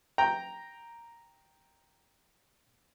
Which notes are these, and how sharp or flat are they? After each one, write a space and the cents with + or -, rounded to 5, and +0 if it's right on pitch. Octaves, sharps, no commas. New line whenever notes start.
G5 +0 A#5 +0